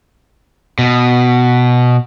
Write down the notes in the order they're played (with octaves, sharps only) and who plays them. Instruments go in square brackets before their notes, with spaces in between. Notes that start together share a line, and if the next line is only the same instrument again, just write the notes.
[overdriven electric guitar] B2